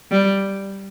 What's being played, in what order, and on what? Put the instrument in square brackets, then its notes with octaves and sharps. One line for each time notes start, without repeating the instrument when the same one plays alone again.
[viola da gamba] G3